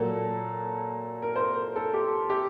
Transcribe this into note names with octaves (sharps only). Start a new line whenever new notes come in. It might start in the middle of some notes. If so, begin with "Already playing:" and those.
Already playing: A#2 F#3 A#3 A4
A#4
C5
A#4
A4
G4
G4